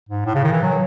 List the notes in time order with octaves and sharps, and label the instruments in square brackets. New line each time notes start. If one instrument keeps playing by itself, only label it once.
[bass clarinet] G#2
A2
C#3
D#3
E3
F#3